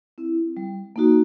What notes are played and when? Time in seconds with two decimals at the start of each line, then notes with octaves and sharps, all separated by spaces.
0.18 C4 E4
0.57 G3
0.96 A#3 D#4 F#4